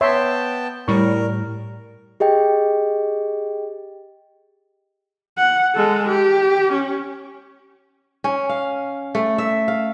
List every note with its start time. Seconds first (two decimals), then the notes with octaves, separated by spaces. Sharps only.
0.01 B3 C#5 E5 G5 A5 C6
0.88 A2 G3 A#4 C#6
2.20 G4 G#4 D#5 G5
5.38 F#5
5.75 G#3 A4
6.09 G4
6.73 C#4
8.24 C#4
8.49 F5
9.15 A3
9.38 E5
9.68 F5